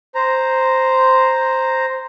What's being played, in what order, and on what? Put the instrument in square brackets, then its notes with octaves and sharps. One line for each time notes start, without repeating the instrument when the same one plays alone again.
[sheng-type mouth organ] C5 A#5